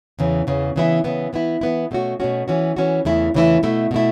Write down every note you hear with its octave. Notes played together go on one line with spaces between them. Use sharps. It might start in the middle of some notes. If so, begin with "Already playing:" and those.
E2 C#3 E3
E2 C#3 E3
C#3 E3 B3 E4
C#3 E3 B3 E4
E3 B3 E4
E3 B3 E4
B2 A3 C#4 F#4
B2 A3 C#4 F#4
E3 C#4 F#4
E3 C#4 F#4
E2 C#3 E3 A3 E4
E2 C#3 E3 A3 E4
B2 A3 E4
B2 A3 E4